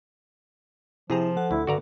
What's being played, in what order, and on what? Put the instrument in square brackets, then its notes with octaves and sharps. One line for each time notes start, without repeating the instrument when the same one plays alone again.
[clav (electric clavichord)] C3 G#4 A#5 [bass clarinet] F3 [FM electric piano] E4 G5
[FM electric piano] A4 F#5
[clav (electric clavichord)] D2 [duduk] E4
[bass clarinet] G2 [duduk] D3 [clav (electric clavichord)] F#4 D5 A#5